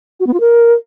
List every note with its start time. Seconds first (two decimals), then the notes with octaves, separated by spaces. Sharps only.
0.20 F#4
0.27 B3
0.33 F4
0.40 A#4